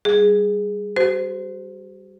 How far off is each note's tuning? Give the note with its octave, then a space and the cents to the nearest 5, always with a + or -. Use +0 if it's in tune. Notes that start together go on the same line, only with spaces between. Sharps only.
G3 +0 G#4 +0
F#4 +35 C5 -20